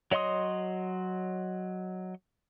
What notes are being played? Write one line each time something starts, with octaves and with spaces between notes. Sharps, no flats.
F#3 C#5 D#5 C6 D#6